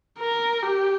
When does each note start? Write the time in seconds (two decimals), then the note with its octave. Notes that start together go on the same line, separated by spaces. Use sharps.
0.19 A#4
0.63 G4